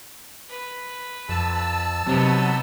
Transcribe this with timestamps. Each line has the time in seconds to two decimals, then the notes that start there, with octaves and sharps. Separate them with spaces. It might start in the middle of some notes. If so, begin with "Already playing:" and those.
0.49 B4
1.29 F2 A5 E6
2.07 C3 F#3 B3 D#4